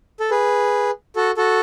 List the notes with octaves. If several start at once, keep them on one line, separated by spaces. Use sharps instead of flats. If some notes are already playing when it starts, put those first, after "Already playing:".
A4
G#4 B4
F#4 A4
F#4 A4